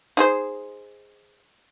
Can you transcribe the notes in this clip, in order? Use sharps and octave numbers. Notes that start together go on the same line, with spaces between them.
D#4 G#4 C5